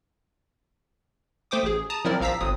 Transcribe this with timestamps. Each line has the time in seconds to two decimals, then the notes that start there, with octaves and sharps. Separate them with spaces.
1.51 A3 C5 G5 D6 D#6
1.63 A1 G#4
1.90 A5 A#5 D#6
2.05 F3 F#3 C4 E4 A#4 D5
2.21 A#1 F3 F5 A#5 E6 B6
2.41 G1 F#3 C4 D#6